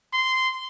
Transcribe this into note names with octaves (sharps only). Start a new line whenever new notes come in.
C6